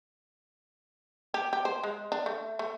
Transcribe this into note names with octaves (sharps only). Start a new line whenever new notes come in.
G4
G4
C5
G#3
D4
A3
A3